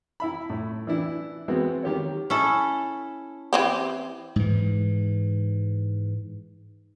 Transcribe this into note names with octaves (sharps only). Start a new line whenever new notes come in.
E4 E5 B5
A2
E3 D4 E4
E3 G#3 B3 C4 F#4
D#3 G4 C#5
C#4 E4 A4
E3 C4 G4
G#2 E3